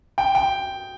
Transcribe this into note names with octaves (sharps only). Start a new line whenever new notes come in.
G5
G5